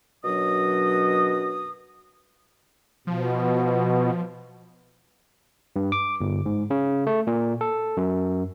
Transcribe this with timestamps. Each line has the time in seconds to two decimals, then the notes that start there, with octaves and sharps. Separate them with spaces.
0.24 F#2 B2 F#3 D4 D#5 D#6
3.07 B2 F3
5.76 G2
5.92 D6
6.20 G1
6.46 G#2
6.70 C#3
7.07 A3
7.27 A#2
7.61 A4
7.97 F#2